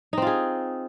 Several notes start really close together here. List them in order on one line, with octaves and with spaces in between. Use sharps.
D#4 C4 F4 G#4